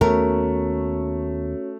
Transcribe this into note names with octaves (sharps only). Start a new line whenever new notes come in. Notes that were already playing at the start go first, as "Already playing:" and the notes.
D#2 A3 B3 C#4 F#4 A#4 C#5